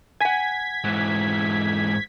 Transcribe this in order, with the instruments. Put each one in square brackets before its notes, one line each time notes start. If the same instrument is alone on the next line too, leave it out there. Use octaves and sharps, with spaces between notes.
[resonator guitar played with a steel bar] F#5 G#5 [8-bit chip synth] G#6 B6
[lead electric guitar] G#2 E3